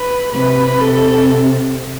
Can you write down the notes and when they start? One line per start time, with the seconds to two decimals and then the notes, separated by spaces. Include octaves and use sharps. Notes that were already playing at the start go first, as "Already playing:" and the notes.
Already playing: B4
0.33 C3 B4
0.81 C3 A4